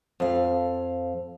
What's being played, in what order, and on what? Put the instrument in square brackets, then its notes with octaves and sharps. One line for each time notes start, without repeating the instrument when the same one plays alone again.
[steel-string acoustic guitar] F2 F5